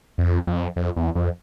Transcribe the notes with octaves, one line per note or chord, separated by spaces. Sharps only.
F2
F2
F2
E2
F2